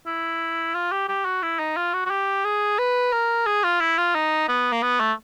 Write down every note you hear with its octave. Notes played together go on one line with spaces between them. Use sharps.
E4
F4
G4
G4
F#4
E4
D#4
F4
F#4
F#4
G4
G#4
B4
A#4
G#4
F4
E4
F4
D#4
B3
A#3
B3
A3